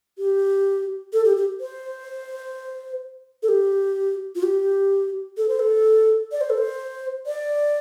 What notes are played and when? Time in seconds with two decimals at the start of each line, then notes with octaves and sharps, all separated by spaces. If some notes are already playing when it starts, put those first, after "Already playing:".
0.18 G4
1.13 A4
1.25 G4
1.37 G4
1.61 C5
3.43 A4
3.49 G4
4.35 F4
4.43 G4
5.37 A4
5.49 C5
5.59 A4
6.32 D5
6.41 C5
6.50 A4
6.59 C5
7.26 D5